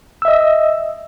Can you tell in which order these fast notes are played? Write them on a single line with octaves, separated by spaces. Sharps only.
E6 E5 D#5